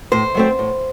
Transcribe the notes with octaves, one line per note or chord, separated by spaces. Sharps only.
A2 C5
F#3 A3 C4
A2